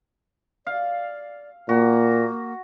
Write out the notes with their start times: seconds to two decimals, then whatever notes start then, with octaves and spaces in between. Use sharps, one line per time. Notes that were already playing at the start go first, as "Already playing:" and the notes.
0.67 D5 F5
1.69 A#2 A#3 F#4